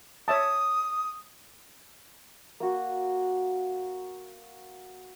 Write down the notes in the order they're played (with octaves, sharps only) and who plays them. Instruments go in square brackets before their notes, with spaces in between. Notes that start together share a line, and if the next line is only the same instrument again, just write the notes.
[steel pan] C#5 E5 A5 [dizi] D#6
[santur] A#3 F#4